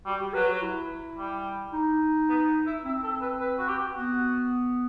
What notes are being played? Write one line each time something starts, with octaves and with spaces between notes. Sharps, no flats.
G3 F#4
G4
F#3 B4
F#4
E4
G3
D#4
B3
E4
C4 E4
A4
B4
B4
F#4
G4
B3 F#4